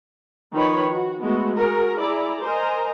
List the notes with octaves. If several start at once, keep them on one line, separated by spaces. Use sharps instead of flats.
D#3 F3 D#4 B4 C#5 B5
F#4
G#3 A3 B3 F#4
F#4 G#4 A#4
E4 G#4 D5 A#5
A#4 C5 D#5 G#5 A#5